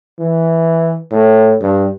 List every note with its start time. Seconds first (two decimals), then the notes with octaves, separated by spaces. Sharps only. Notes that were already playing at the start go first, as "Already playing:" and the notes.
0.19 E3
1.11 A2
1.61 G2